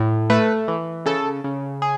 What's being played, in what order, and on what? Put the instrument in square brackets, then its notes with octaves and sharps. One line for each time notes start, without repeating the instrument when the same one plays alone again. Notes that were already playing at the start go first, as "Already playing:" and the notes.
Already playing: [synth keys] A2
A3 B4
E3
C#3 A4
C#3
G#4